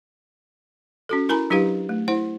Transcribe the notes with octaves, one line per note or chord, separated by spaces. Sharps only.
C#4 F#4 A4
E4 A#4 G#5 A#5 B5
F#3 D4 E4 G4 B4 F5
A3
E4 C5 F#5